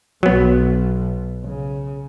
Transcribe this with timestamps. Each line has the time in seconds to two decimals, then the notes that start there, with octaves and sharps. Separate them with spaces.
0.23 B1 F#3 B3
1.44 C#3